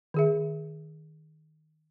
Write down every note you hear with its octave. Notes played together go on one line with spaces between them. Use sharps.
D#3 G#4 E5